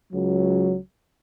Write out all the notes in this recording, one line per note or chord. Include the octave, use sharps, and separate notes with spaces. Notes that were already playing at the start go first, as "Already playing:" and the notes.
C#2 F#3